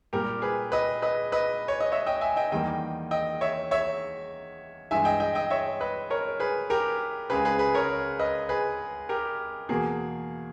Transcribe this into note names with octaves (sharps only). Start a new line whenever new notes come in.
A#2 G3 A#3 G4 A#4
G#4 B4
B4 D#5
B4 D#5
B4 D#5
C#5
D#5
C#5 E5
D#5 G5
E5 G#5
D#5 G5
E2 D#3 G3 A#3 D#5 G5
D#5 G5
C#5 E5
C#5 E5
G2 E3 G#3 E5 G#5
D#5 G5
D#5 G5
D#5 G5
C#5 E5
B4 D#5
A#4 C#5
G#4 B4
G4 A#4
C#2 C#3 G#3 G#4 B4
G#4 B4
G#4 B4
A#4 C#5
B4 D#5
G#4 B4
G4 A#4
E2 B2 A#3 G#4